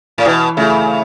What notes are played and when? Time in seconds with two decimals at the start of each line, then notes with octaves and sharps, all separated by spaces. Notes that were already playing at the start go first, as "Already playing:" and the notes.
0.18 A2
0.26 B2 E3
0.57 C#3 A3 E4